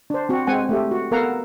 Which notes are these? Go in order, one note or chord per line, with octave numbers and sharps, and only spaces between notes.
D4 C5
C4 F#4
G#3 C4 F#5 G#5
A3 G4
F#4
B3 A4 A#4 F5 F#5 A#5